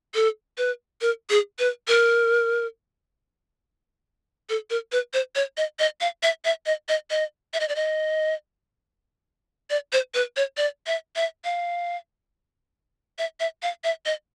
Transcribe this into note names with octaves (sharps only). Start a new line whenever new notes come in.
A4
B4
A#4
G#4
B4
A#4
A4
A#4
B4
C5
C#5
D#5
D#5
F5
E5
E5
D#5
D#5
D#5
E5
D#5
D5
D#5
D5
C5
B4
C#5
D5
E5
E5
F5
E5
E5
F5
E5
D#5